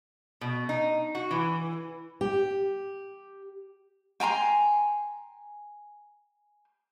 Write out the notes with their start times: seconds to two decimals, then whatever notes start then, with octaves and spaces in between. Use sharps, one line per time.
0.41 B2
0.69 D#4
1.15 F#4
1.31 E3
2.21 G4
4.20 G5 G#5 A#5 C6